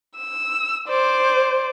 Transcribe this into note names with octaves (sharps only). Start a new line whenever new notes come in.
E6
C5 D5